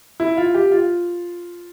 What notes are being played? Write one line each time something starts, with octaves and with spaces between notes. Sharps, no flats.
E4
F4
G4
F4